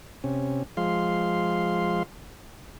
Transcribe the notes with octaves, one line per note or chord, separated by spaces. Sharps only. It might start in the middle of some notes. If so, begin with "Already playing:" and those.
C3 C#4
F3 G#3 F5 C6